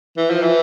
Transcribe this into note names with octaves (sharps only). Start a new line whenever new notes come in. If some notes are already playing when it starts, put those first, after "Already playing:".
E3
F3
E3